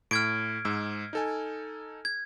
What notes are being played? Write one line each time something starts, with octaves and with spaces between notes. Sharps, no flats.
A2 F6 G#6 D7
G#2 E6
D#4 A4 G#5
G#6